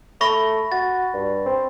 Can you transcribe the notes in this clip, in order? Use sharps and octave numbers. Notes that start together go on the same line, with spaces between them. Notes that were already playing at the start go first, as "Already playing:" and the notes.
A3 B5 C#6 A#6
F#4 A6
G2
C4